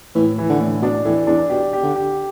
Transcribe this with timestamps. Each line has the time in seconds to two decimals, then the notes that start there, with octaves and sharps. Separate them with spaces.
0.15 A2 E3
0.38 E3
0.49 D3
0.60 A2
0.82 B2 D4
1.05 A2 E3
1.27 E2 D4
1.50 B2 G4
1.73 G4
1.83 D3
1.96 G4